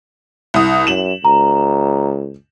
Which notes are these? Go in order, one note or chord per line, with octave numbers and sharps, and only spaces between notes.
C2 D#6
F#2 E7 F#7
C#2 A#5